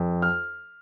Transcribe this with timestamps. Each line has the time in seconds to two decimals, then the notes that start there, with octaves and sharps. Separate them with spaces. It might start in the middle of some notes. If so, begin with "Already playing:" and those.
Already playing: F2
0.22 F6